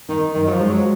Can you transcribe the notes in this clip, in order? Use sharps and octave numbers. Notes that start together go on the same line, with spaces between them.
D#3 D#4
F#2 D#3
F#3
F3
G#3
F#3